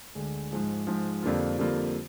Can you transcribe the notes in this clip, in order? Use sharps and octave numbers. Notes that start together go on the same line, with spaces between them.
D2 D3 G#3
G#2 F3 G#3
G#2 F3 G#3
F2 D3 G3 A#3 F4
F2 D3 G3 A#3 F4